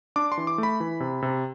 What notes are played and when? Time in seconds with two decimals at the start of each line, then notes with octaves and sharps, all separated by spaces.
0.16 D4 D6
0.32 C6
0.37 E3
0.47 D6
0.58 A3
0.63 B5
0.80 E3
1.00 C3
1.22 C3